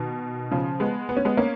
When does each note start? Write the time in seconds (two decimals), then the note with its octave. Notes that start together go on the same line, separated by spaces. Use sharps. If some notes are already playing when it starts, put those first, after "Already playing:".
Already playing: B2 D#3
0.52 C#3 F3
0.80 G#3 B3
1.09 B3
1.17 C#4
1.25 G#3 B3
1.37 A#3 C#4